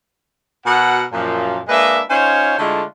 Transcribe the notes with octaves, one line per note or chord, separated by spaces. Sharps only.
B2 F#4 A#4 F#5
F#2 A#2 F3
G#3 A#3 D4 B4 D#5 E5
C#4 D#4 F4 C5 C#5
D3 G#3 A3 D4 E4 F4